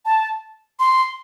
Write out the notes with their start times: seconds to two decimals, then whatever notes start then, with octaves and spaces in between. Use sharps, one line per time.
0.05 A5
0.79 C6